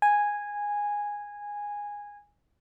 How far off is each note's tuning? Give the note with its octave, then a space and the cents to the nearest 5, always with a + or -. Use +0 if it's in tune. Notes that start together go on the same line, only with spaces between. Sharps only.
G#5 -10